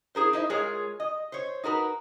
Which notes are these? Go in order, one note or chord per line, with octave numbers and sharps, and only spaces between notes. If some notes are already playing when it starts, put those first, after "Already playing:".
E4 G#4 A#4 C5
D#4 E4 C5 D#5 E5
G#3 F4 G#4 A#4 C#5
D#5
C5 C#5
D#4 F#4 A#4 B4